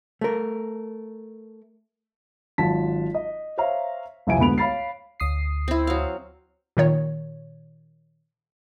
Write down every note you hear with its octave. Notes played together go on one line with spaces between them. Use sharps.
A3 A#4
G#1 F#3 F4 A5 B6
D#5
C5 C#5 E5 F5 A#5
C2 F2 E4 C5 G#5 D7
D2 G#2 B3 B5 D7 F7
C#5 F5 B5 A6 C7
D2 D#6 C7
C4 E4
F#3 F5
A#2 D#3 C#5